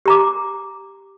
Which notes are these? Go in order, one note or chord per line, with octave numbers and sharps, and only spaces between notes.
G4 A#5 D6